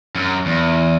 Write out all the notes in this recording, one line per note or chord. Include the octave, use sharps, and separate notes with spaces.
F#2
E2